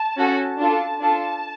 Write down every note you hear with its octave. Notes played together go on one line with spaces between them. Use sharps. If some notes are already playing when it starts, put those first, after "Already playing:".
Already playing: A5
C#4 F#4 A4
D4 F4 A4 A5
D4 F4 A4 A5